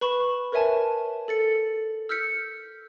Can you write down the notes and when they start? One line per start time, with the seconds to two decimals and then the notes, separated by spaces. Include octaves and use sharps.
0.01 B4 B5 C#6 E7
0.52 A#4 B4 C#5 E5 G#5 A5
1.28 A4 A6 C#7
2.09 E6 F6 G6 B6 C#7